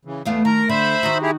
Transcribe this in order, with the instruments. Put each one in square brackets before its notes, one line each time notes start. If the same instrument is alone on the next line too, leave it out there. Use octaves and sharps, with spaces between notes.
[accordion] C#3 E3
[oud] E2 A3 F5 [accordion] B3
[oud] D#3 [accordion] A#4 A#5
[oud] D3 [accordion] C5 E5 B5
[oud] D#3 D#4 F#4
[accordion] E4 G4 G#4